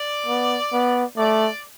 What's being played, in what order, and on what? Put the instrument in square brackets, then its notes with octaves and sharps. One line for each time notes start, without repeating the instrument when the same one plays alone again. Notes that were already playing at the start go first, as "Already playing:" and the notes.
Already playing: [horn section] D5
[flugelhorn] B3
B3
[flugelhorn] A3 [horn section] D5